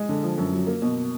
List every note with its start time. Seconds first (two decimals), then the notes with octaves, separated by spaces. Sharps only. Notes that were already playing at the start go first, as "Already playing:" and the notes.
Already playing: G#3
0.09 D3
0.23 F3
0.38 F#2
0.52 F#3
0.67 A#3
0.82 B2